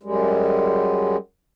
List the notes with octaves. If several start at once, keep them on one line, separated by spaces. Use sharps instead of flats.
F#2 G3 G#3